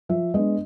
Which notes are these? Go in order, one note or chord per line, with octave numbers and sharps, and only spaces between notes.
F3 E5
G#3 B3 D4 D#5